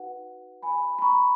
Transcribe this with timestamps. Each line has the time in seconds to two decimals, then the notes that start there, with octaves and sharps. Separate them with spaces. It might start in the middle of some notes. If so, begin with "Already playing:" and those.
Already playing: D#4 F#4 B4 F#5
0.62 G#5 B5
0.98 B5
1.02 A#5 C#6